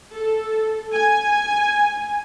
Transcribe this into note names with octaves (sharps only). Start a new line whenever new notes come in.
A4
G#5